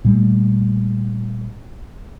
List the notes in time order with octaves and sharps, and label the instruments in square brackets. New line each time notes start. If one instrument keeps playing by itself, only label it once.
[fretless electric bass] A#2 G3 A3